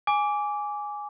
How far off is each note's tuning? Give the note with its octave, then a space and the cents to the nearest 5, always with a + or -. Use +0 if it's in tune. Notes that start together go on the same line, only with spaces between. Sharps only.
G#5 +0 D6 -15